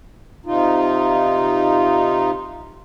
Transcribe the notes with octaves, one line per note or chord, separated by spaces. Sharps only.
C3 D#4 F4